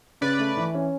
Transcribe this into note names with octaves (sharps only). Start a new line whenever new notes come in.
C#3 B4 D5
A3
E3
C#4